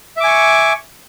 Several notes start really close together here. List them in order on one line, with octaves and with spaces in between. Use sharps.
E5 D6 G#5 C#6